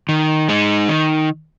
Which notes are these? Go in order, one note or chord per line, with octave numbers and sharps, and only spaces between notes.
D#3
G#3 D#4
D#3